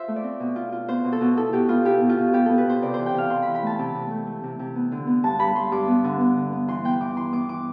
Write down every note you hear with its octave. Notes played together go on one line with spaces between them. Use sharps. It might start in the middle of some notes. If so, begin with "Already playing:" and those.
Already playing: F4 C5 E5
A3
D5
C4
B2
F4
F4
B3 C5
B2
A4
B2
E4 A4
B2 G4
B3 F4
E4 G4
B2
F4
B2
B3 G4
B3 A4
B4
B2 C5
C3 D5
E3 C5
G5
C3 F5
C3 C6
E3 B5
B5
A3 A5
C3 A5
C3
A3
A3
C3
C3
B3
D3
B3
G2 A5
G2 B5
G2 C6
G2 D6
B3
D3
B3
D3
B3
E3 C6
B3 G5
E3 D6
E3 C6
B3 D6
E3 D6